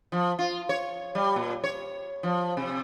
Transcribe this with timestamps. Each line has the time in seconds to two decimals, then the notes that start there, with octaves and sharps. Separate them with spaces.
0.12 F3
0.39 F4
0.69 C#5
1.15 G3
1.36 A#2
1.64 C#5
2.23 F3
2.57 C3